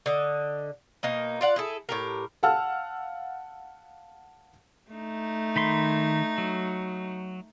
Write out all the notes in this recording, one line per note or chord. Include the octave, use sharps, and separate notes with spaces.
D3 D#5
B2 A#3 D#4
F4 D5 F#5
E4 G#4 A4
A2 G4 A#4
F5 F#5 A5 E6 F6
A3 D#4
D#3 B5 C6
F#3